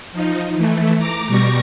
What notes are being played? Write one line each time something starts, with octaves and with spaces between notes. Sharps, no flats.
F3 D#4
E3 A3
A#5 D6
B2 G3 C#6 A#6 C#7